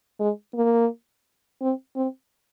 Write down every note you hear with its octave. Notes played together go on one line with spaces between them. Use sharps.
G#3
A#3
C4
C4